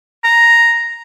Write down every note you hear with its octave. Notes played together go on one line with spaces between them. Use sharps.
A#5